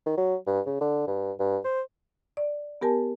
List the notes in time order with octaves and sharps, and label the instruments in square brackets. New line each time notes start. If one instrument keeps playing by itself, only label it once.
[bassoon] D#3
F#3
G2
C#3
D3
G2
G2
C5
[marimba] D5
B3 G4 A#4 G#5 A5